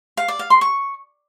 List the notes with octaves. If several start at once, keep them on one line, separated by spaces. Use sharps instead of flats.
F5
D5
F5
C6
C#6